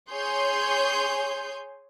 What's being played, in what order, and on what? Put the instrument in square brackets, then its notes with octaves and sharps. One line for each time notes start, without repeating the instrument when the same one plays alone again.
[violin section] G#4 C#5 G#5 C6 G6